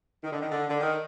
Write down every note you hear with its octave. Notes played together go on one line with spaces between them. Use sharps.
D#3
D3
D#3
D3
D3
D#3